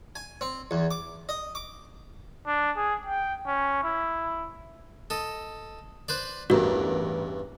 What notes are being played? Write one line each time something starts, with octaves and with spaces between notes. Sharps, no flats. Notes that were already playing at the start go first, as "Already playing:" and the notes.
G#5
C4
E2
D6
D#5
D6
D4
G#4
G5
C#4
E4
A4 D#5
B4 C5 D5
A1 E2 G2 F#4 A#4